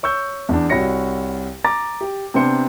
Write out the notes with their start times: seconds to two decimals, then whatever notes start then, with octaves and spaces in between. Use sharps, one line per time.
0.03 C#5 C#6 E6 G6
0.49 E2 D4
0.69 C2 F#4 C#5 A#6 C#7
1.65 A#5 D6 A6
2.01 G4
2.34 C3 B3 D4 C5 C#7